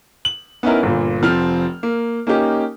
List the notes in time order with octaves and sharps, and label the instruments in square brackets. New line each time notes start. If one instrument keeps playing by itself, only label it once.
[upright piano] F#7
B3 C#4 D#4 E4 A#4
G1 A#2
F1 F3 C4 F6
A#3
A#3 C#4 D#4 G4